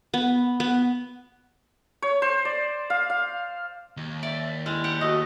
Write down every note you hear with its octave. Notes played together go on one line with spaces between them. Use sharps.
B3
B3
C#5
C5
D5
F5
F5
D#2
D5 E5
G3 G#3 E4
G4 F#5
A3 F#4 D#5